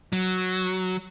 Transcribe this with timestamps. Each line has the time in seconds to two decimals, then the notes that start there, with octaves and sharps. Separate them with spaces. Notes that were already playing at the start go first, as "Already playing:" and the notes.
0.13 F#3